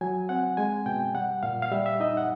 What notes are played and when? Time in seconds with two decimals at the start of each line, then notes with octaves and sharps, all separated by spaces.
0.01 F#3 G#5
0.29 C4 F#5
0.57 G#3 G#5
0.86 B2 G5
1.14 G3 F#5
1.43 A#2 F5
1.62 F5
1.71 G3 E5
1.86 E5
2.00 D#4 D#5
2.17 F#5